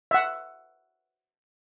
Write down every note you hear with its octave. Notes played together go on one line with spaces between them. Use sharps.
E5 F#5